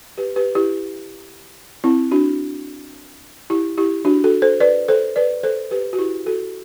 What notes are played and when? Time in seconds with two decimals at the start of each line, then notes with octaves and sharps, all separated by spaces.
0.18 G4 B4
0.36 G4 B4
0.55 E4 G4
1.84 C4 E4
2.11 D4 F#4
3.50 E4 G4
3.78 E4 G4
4.05 D4 F#4
4.24 F#4 A4
4.42 A4 C5
4.60 B4 D5
4.88 A4 C5
5.16 B4 D5
5.43 A4 C5
5.71 G4 B4
5.93 F#4
5.98 E4 G4
6.26 F#4 A4